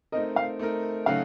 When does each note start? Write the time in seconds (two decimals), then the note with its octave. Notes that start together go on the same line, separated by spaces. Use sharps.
0.12 A3 C4 D#4 A#4 D#5
0.36 F5
0.59 A3 C4 D#4 A#4
1.06 C#3 F#3 A3 D#4 F#4 F5